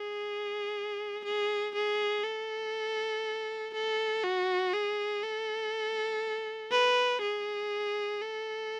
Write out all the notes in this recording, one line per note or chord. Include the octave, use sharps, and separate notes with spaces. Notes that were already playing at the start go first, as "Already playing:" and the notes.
Already playing: G#4
G#4
G#4
A4
A4
F#4
G#4
A4
B4
G#4
A4